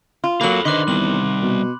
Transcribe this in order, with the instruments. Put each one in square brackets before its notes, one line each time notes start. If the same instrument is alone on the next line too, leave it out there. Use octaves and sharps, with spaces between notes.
[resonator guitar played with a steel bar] F4
[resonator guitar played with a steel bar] F#3 A#3 [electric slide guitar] F4 A4 [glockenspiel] B5 F#6 F#7
[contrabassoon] D3 [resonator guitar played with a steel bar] D#3 [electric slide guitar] B4 C5 D#5 [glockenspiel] C6 D6 F#6
[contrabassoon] E2 [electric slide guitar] G3 C4 [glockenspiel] F#7
[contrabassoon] B2